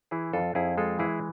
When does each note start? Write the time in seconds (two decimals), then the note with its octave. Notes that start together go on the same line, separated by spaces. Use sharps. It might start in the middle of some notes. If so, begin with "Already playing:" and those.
0.11 E3 E4 G#4
0.33 F2 F4 A4
0.55 F2 E4 G#4
0.78 G#3 F4 A4
0.99 E3 E4 G#4